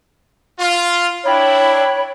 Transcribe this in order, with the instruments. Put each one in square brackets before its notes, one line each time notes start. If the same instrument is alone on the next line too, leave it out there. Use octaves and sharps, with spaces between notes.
[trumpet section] F4
[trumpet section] D4 E4 [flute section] C#5 G5 B5